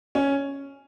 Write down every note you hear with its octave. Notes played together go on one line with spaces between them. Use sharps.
C#4